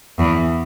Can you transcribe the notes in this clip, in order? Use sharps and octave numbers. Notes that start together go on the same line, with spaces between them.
E2